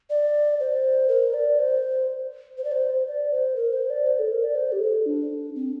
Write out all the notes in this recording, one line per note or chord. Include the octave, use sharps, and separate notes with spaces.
D5
C5
A#4
D5
C5
C5
D5
C5
D5
C5
A#4
C5
D5
C5
A4
A#4
D5
C5
G4
A4
D4
C4